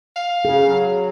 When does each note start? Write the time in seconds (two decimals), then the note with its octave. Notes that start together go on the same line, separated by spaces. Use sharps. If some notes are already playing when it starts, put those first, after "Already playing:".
0.16 F5
0.45 C#3 G#4
0.66 F#3